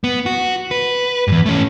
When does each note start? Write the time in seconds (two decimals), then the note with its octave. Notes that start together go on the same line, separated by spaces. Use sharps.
0.04 B3
0.26 F#4
0.71 B4
1.28 E2 G2
1.46 A3 C#4